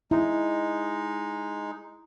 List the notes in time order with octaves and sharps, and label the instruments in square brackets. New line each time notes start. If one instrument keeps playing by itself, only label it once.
[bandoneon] G#3 D#4 [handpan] E4